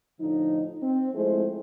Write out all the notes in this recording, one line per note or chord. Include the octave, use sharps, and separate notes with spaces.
A2 D3 F3 D#4
C4
F3 G#3 A3 E4 G#4 C5